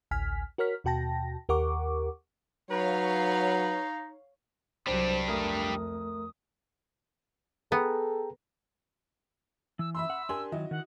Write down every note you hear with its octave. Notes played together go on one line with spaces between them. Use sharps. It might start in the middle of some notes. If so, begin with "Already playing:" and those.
A1 D2 G#5 F6 B6
F#4 A#4 C#5 F6 B6
D#2 B2 F#4 G5 A5 A#6
D#2 G4 A#4 F#5 C#6 D6
F#3 D#4 B4 C#5 F5
C2 F#3 G3 D4 C5
F2 A3 A#4 D#6
B3 G#4 A4 G5 A#5
E3 E6
E5 B5 C6 E6
F#5
D4 G4 A#4 G#5 C6
D#3 F#3 E4 F#4 D#5
D#3 F#5